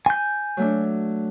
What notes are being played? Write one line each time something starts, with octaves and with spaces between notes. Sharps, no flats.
G#5 G6
F#3 A3 D4